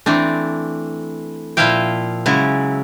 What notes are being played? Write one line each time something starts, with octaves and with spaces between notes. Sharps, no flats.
E3 A3 C4 D4
A#2 F3 E4 E5 F5 G5
C#3 F#3 G#3 E4